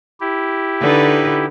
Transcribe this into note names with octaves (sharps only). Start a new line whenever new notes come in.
E4 G4
D3 D#4 B4